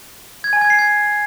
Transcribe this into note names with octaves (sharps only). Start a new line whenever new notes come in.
G#6
G#5
G#6
C7
G#6